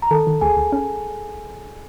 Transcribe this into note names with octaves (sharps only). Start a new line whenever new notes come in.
A#5
D#3 A4 A5
D#3
D2 G#4 G#5
D2
C#4